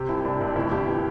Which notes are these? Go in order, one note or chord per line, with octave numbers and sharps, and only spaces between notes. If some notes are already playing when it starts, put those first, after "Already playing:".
Already playing: C3 G4
C2 E4
C2 D4
C2
D4
D2 E4
D2 G4
E3